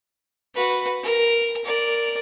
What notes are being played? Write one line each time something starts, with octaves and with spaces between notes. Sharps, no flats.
F#4 B4
A#4
A#4 D5